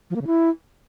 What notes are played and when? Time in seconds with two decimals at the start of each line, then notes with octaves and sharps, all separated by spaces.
0.10 F3
0.16 A#3
0.21 C#3
0.27 E4